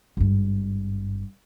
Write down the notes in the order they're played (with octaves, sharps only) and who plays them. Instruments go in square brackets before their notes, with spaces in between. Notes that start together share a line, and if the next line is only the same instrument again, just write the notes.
[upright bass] G#1 G2